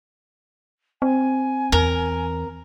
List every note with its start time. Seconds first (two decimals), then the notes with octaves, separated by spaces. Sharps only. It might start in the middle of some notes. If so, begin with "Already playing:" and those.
1.02 C4 G#5
1.72 E2 A#4